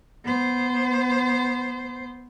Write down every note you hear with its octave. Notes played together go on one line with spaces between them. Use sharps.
B3 C5